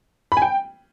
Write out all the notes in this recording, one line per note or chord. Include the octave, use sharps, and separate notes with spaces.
B5
G#5
G5